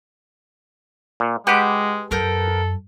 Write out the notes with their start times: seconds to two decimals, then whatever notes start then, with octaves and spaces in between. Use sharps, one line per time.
1.20 A#2
1.47 G#3 F#4 G4 B4 F#5 D6
2.11 F#2 B3 A4 A#4 G6